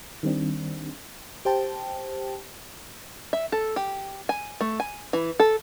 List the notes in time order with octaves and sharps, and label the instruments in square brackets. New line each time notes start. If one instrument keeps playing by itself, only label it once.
[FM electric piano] D#3 G3 C4 D4
G4 C5 G5 A5
[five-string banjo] E5
A4
G4
G#5
A3
G#5
E3
A4